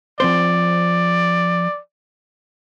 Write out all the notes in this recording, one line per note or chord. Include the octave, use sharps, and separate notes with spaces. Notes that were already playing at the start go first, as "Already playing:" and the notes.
F3 C4 C5 D5